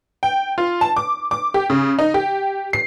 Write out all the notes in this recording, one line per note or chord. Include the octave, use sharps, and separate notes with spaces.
G5
F4
A5
D6
D6
G4
C#3
D#4
G4
C7